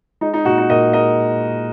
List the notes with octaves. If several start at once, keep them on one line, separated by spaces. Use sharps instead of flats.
G#3 D#4
D#4
A#2 F#4
D#4
A#2 A#4 D#5
G#3 A#4 D#5